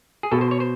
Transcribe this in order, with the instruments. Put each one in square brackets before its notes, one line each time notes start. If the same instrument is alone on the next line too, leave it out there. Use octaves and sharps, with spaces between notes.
[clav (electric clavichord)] G#4
B2 A4
C5
C#5
C5